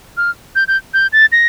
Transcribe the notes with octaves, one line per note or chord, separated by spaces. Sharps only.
F6
G6
G6
G6
A6
A#6